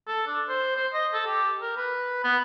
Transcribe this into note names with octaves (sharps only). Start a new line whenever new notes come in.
A4
D4
C5
C5
D#5
A4
G4
A#4
B4
B3